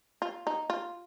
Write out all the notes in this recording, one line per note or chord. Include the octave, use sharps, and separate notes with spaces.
F4
D#4
F4